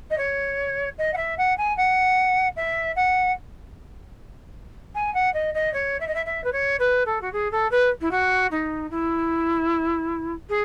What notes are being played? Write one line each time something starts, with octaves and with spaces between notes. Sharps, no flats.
D#5
C#5
D#5
F#5
E5
F#5
G#5
F#5
E5
F#5
G#5
F#5
D#5
D#5
C#5
E5
D#5
E5
E5
B4
C#5
B4
A4
F#4
G#4
A4
B4
E4
F#4
D#4
E4
G#4